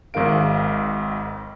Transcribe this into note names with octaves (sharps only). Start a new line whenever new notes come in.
G#1 G#2 D#3 A#4 F5 D7